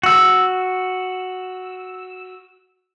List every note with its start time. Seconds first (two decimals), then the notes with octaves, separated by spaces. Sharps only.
0.03 F#4 E6